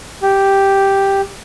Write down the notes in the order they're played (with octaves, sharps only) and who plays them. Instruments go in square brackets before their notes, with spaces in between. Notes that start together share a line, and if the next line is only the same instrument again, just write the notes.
[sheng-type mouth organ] G4